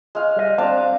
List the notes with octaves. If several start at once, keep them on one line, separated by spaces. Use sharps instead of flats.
G#3 F5
G3 D#5
C4 D4 F5 A5